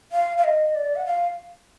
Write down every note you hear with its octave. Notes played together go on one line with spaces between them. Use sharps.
F5
F5
D#5
D5
F#5
F5